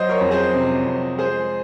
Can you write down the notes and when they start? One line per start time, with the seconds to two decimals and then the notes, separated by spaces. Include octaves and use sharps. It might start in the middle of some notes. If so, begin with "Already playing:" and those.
Already playing: F#3 C5 D#5
0.09 A#4 C#5
0.21 F2
0.31 G#4 C5
0.54 C3
0.86 F2
1.19 G#3 G#4 C5